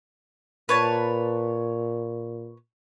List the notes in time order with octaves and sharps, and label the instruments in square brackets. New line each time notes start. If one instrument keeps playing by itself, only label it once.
[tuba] A#2 [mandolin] B4 C#5 A5